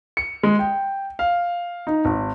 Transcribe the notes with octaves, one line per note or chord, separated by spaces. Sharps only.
C#7
G#3
G5
F5
D#4
G#1